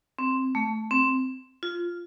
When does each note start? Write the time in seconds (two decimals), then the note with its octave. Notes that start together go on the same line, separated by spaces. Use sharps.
0.19 C4
0.55 A3
0.91 C4
1.63 F4